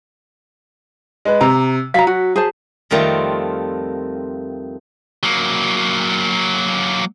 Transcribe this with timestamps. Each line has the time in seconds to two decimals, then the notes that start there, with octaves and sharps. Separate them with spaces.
1.25 G#3 B4
1.41 C3 A#5
1.94 F#3 F5 A#5 B6
2.07 F#4
2.36 G#4 C5 A5
2.91 F2 D#3 G3 A3 C4 F4
5.23 F#3 A#3